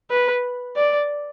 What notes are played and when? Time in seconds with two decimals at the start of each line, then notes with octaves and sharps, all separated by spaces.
0.11 B4
0.76 D5